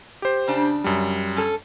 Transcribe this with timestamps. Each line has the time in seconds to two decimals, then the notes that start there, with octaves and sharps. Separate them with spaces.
0.22 G4 C5
0.48 C#3 D4
0.84 F#2 G3
1.37 C#4 A4